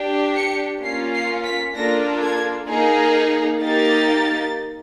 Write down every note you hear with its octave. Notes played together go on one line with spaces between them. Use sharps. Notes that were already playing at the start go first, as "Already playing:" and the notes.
Already playing: D4 G4
C#7
A#3 C#4 F4 C7
C7
B6
A#3 D4 F4 A4 A#6
G#6
A#3 D#4 G#4
A#3 D#4 G4 A6